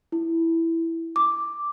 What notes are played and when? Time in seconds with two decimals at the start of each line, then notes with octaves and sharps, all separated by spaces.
0.12 E4
1.16 D6